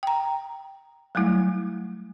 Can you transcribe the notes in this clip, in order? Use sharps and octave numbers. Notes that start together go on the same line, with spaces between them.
G5 A#5
F#3 G3 A3 E4